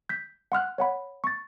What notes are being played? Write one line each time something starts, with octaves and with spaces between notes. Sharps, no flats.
G6 B6
F#5 C6 F6 F#6
C#5 F#5 B5
C#6 A6